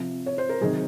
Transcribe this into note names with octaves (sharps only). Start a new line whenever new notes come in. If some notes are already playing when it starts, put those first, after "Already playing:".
Already playing: C3 F3
C#5
C5
A#4
C3 D#3 F#3 G#4